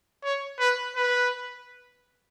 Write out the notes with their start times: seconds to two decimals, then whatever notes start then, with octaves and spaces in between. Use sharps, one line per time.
0.24 C#5
0.60 B4
0.96 B4